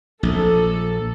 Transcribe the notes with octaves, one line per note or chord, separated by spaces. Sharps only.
A#1 A4